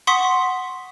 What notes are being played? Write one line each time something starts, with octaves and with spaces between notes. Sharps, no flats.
F#5 C6 C#6 D#6 B6